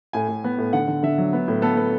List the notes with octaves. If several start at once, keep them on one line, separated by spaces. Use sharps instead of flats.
A2 G#5
A2
B3
A2
D3 F#5
D3
D3 E5
F#3
B3
A2
B3 A4
B3